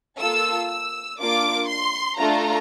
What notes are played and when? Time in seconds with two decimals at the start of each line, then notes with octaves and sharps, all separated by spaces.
0.19 A#3 F4 A4 E6
0.70 E6
1.19 A#3 D4 F4 D6
1.68 C6
2.18 A3 D4 F4 A4 A#5